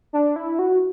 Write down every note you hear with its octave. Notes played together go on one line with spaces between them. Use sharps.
D4
E4
F#4